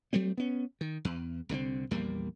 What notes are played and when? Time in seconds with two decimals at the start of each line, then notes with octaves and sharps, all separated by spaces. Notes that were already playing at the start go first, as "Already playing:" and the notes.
0.13 F#3 G3 A3 C4
0.38 B3 C#4
0.81 D#3
1.05 E2
1.49 C2 D3 F#3 C4
1.91 A#1 E2 G3 A#3